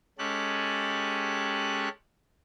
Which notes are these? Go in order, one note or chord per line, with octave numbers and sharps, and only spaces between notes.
G#3 C#4 G4 A4 F#6